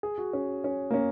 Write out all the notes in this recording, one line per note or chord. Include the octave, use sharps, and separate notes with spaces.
G#4
F#4
C#4
C#4
A#3
C#4